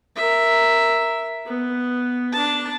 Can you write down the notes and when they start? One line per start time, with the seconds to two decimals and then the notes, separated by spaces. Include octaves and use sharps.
0.16 A#4 E5
1.46 B3
2.32 D4 A5